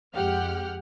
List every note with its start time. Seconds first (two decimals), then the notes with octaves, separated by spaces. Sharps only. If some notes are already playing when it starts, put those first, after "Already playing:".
0.15 F2 G#3 G4 F#5 G5 F6